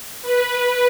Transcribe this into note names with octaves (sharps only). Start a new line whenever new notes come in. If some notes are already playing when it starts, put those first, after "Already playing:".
B4